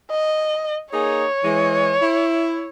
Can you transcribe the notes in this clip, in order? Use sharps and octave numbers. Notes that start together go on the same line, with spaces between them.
D#5
A#3 D#4 G#4 C#5
E3 G#3
E4